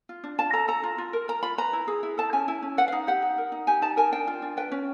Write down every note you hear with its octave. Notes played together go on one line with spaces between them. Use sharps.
F4
D4
F4 A5
A4 A#5
A4 A#5
F4
F4
A#4
A#4 A#5
F4 B5
B4 A#5
E4
G#4
E4
A4 A5
C#4 G#5
E4
C#4
B4 F#5
F5
D#4
G4 F#5
D#4
A#4
D#4
G4 G#5
D#4 A5
A#4 G#5
D4 G5
F4
D4
B4 G5
C#4